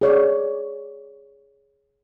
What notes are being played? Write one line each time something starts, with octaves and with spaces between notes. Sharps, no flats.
G#4 C#5 D5